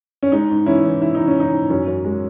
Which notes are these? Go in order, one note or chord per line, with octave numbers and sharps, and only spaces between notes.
C#4
G#3 D#4
G#2
E3 C#4 E4
E3
G#2 E4
E3 D#4
C#4
E3 D#4
G#2
F#2 C#4
F#2
G#3